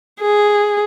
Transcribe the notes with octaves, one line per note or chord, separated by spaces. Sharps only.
G#4